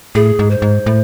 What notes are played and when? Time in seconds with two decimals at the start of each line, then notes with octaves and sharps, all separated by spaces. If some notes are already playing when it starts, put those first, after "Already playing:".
0.15 A2 G#4
0.39 G#2
0.51 C5
0.62 G#2
0.86 A2